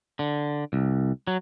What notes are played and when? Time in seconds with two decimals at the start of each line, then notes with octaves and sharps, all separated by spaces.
0.19 D3
0.73 C2
1.27 F#3